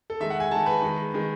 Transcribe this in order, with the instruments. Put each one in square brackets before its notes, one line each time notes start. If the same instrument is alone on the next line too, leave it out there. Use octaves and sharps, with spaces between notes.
[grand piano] A4
D#3 G#3 E5
F#5
G#5
D#3 G#3 A5
B4
D#3 G#3
D#3 G#3